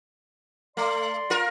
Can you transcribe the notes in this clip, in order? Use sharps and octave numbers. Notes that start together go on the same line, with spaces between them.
A3 D5 C6
F4 A#4